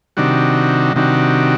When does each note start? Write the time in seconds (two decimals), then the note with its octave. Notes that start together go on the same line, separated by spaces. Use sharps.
0.17 C3 D#3 G3 D4 F#4
0.96 C3 D#3 G3 D4 F#4